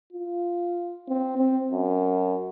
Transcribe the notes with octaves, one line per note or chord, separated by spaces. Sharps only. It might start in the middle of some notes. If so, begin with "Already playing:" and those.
F4
C4
C4
F#2